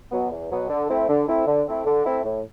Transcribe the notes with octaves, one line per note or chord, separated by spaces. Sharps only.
B2 F#3 B3
E2
B2 F#3 B3
D3
A3 C4 E4
D3
A3 C4 E4
D3
A3 C4 E4
D3
A3 C4 E4
A2